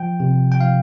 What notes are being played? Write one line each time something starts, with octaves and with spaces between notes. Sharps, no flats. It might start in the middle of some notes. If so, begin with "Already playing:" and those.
Already playing: F3 G5
C3
G5
F3 F5